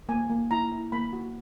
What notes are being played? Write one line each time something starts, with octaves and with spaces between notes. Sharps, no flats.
A#3 G#5
A#3
E4 A#5
E4
A#3 B5
F#4